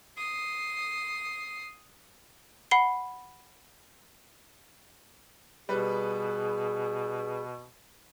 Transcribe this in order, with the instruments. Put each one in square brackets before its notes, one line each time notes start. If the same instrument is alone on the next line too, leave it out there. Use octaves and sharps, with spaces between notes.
[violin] D#6 C7
[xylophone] F#5 B5 C7 G7
[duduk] B2 [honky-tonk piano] G3 B4 [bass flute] G#4